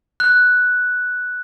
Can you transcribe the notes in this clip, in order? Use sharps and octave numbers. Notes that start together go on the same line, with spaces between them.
F#6